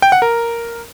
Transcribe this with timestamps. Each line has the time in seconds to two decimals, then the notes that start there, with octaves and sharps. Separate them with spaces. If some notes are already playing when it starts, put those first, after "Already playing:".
0.02 G5
0.12 F#5
0.22 A#4